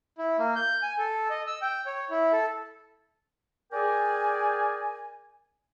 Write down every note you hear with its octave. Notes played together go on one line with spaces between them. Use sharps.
E4
A#3
G6
G#5
A4
D#5
E6
G5
C#5
E4
A4
G#4 A#4 D5 G5 G#5